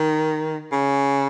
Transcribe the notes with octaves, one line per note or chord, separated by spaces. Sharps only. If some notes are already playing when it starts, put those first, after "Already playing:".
Already playing: D#3
C#3